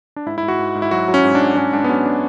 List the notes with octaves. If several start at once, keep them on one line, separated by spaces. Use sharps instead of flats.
D4
G#2 E4
G#2 E4
F#4
G#2
G#2
E4
F#3 F#4
F#3
C#4
G#2
D4
G#2
G#2 C#4
G#2 D4
B3
F#3 C#4
D4